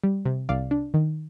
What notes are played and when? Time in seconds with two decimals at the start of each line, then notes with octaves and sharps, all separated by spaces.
0.04 G3
0.25 C3
0.49 C2 D5 F5
0.71 D4
0.94 D#3